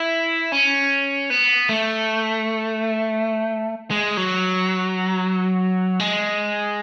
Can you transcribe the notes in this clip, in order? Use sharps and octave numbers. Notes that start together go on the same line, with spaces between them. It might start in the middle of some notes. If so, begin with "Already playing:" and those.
Already playing: E4
C#4
B3
A3
G#3
F#3
G#3